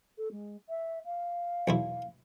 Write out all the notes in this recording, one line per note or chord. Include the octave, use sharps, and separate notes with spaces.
A4
G#3
E5
F5
B1 E2 E4